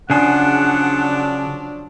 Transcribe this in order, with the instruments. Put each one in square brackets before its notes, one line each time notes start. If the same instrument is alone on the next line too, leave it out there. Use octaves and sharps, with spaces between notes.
[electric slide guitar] C#3 G#4 [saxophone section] F3 F#3 D4 [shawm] F#5